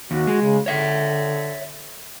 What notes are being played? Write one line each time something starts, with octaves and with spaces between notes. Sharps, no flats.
D#2 F#4
G#3
C#3
D3 C#5 E5